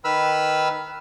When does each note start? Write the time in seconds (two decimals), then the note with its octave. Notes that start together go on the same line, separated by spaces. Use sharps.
0.04 D#3 B4 B5 E6 F6